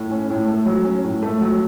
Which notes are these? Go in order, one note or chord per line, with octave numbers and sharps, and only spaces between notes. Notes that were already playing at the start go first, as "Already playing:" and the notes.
Already playing: A2
C#4
A2
A3
F#3
C#4
A2
A3
F#3